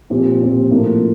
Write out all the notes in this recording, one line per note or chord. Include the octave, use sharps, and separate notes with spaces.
A#2 F3 C4 G4
A#2 F3 C4 G4
A2 F3 A#3 D4 F4